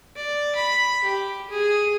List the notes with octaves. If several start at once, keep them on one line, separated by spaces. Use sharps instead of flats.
D5
B5
G4
G#4